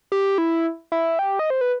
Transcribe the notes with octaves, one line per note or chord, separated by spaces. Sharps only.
G4
E4
E4
G4
D#5
C5
B4